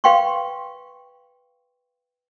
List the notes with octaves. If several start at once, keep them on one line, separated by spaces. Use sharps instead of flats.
B4 F5 G5 C6 C#6